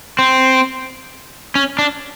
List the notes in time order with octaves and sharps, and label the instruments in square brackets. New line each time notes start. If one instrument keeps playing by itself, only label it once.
[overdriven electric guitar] C4
C#4
D4